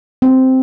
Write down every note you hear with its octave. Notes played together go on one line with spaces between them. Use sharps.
C4